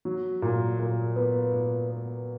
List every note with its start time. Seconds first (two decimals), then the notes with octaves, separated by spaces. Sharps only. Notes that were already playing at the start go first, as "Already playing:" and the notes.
0.05 F#3
0.42 A#2
0.79 A#2
1.16 B3
1.53 A#2
1.90 B3